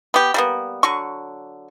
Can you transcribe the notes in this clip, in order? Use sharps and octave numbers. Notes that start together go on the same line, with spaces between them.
B3 G4
G3 A#3 B3
D3 F#3 C#6